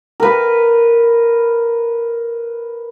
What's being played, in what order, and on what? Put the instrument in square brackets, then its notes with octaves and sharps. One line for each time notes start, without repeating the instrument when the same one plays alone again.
[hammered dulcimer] A#4 B4